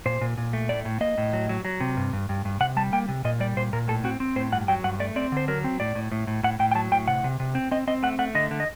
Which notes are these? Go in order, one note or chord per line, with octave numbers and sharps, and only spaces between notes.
A#2 C5
A#2
A#2
A3
A2 D5
A2
A#3 D#5
A2
F#3
F#3
F#3
C3
G2
G2
G2
G2
C3 F#5
G3 A5
A#3 G5
C3
A#2 D#5
G3 D5
A#2 C5
A#2 A#4
A2 A4
C4 F#4
C4
A2 C5
G2 F#5
F#3 G5
G2 F#5
A3 D5
C4 D5
D3 C5
F#3 A#4
C4
A2 D5
A2
A2
A2
A2 F#5
A2 G5
G5
F#3 A5
A2 G5
C3 F#5
C3
C3
C4
C4 D#5
C4 D#5
A3 F#5
A3 F#5
D3 D#5
D3
D#5